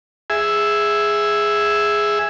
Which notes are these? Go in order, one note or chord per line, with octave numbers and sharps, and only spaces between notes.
G#4 E5